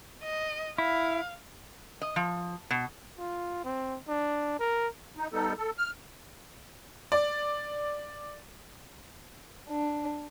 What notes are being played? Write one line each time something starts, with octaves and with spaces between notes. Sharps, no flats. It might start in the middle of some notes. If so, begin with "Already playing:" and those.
D#5
E4 F5
D#5
F3
B2
F4
C4
D4
A#4
D#4
G3 B3 D#4 A4
A4
F6
D5
D4